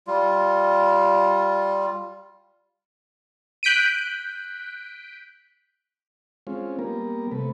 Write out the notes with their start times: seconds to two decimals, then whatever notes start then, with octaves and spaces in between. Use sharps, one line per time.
0.07 G3 F4
3.63 F#6 G6 B6 D7 D#7
6.47 G#3 C4 C#4 F4
6.79 G3 A#3 B3 A#4
7.32 C3 A3 B4